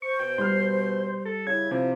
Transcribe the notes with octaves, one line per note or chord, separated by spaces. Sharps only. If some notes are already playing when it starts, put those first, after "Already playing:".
C5 C#6
B2 G5
G3 C6 F6
A4
C#3 E4 G#6
C3 F3